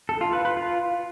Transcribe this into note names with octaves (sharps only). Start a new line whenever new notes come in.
A4
F4
B4
B4
F4